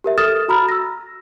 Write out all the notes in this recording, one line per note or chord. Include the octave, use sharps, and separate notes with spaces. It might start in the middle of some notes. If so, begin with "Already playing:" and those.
G4 A#4 E5
A4 D#6 F6 A6 E7
F#4 A#5 B5 F6
E6 A#6